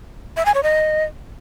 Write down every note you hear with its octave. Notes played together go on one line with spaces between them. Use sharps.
E5
G#5
C#5
D#5